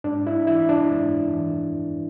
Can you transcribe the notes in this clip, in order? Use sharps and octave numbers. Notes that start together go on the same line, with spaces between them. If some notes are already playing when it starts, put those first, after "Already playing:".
G#2 D4
E4
E3 E4
D4
G#2
E3